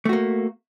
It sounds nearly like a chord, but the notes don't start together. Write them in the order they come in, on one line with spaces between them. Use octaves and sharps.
A3 F#4 A#3